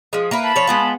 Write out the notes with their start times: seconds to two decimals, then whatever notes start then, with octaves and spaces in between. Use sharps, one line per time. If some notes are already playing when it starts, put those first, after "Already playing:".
0.13 F3 G#3
0.31 A#3 E4 B4
0.44 A5 B5
0.56 F3 C#5
0.67 G#3 B3 F4